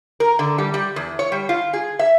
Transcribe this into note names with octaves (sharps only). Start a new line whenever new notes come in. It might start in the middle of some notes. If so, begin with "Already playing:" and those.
A#4
D3
G3
G3
E2
C#5
G3
F4
G#4
E5